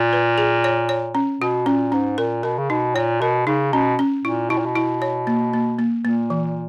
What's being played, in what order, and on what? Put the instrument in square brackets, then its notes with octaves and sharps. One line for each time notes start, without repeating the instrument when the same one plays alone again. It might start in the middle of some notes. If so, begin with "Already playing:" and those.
Already playing: [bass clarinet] A#2
[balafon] B4
G#4
C#5
C#5
C#4
[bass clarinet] B2 [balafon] F#4
[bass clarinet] A#2 [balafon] C#4
[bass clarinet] G#2 [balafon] C#4
[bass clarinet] A#2 [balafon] A#4
[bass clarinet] B2 [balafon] A#4
[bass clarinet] C#3
[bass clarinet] B2 [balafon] D#4
[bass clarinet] A#2 [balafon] C#5
[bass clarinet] B2 [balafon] A#4
[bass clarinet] C#3 [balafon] D#4
[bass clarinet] B2 [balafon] C#4
[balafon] C#4
[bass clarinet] A#2 [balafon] E4
[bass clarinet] B2 [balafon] E4
[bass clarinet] A#2
B2
[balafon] E4
C#5
A#3
A#3
A#3
[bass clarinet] A#2 [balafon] A#3
[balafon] E3